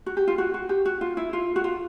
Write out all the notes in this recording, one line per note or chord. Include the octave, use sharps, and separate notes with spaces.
F#4
G4
F4
F#4
F#4
G4
F#4
F4
E4
F4
F#4
F4